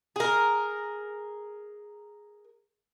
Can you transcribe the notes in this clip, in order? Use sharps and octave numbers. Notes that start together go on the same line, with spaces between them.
G#4 A#4